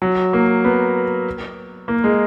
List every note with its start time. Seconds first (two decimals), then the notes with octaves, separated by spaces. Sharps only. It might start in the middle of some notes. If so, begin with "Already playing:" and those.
0.02 F#3
0.33 A#3
0.64 B3
1.88 A#3
2.04 G#3